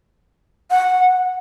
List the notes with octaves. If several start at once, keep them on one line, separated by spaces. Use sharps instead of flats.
F#5